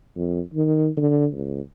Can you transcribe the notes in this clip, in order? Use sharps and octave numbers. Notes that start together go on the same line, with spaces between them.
F2
D#3
D3
C#2